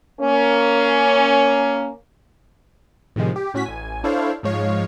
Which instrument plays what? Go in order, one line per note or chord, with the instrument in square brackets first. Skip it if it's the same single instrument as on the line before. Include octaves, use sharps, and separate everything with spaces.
[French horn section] A#3 C#4
[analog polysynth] A2 C3 D#3 F3 G#3
G4
A2 C#4 F#4 B6
A1 G#5
D4 E4 A4 C5 C#5 F5
G#2 F3 G#3 C#5 F5